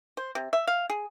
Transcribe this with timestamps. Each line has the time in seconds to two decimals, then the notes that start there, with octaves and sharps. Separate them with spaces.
0.17 C5
0.35 C3
0.53 E5
0.67 F5
0.90 G#4